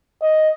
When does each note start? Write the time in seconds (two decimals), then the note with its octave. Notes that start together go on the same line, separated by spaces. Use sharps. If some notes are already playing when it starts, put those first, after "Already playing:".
0.22 D#5